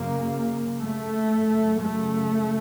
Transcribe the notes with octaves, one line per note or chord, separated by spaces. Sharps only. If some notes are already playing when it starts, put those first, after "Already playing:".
Already playing: F#2 C#3 A#3
A3
F#2
C#3
A3